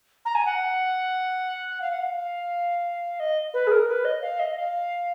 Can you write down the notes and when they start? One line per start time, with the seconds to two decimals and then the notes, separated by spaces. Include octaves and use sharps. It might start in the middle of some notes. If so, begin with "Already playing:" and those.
0.25 A#5
0.34 G#5
0.45 F#5
1.81 F5
1.90 F#5
2.00 F5
3.19 D#5
3.53 B4
3.67 G#4
3.71 A#4
3.87 B4
4.04 D#5
4.21 F5
4.39 D#5
4.56 F5